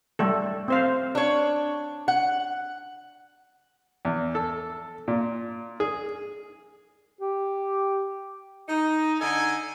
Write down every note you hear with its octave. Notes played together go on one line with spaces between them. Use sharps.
G3 A3 A4
C4 C5 F5
D4 C#5
F#5
E2
A4
A#2
G#4
G4
D#4
D3 D#4 A4 D#5 G#5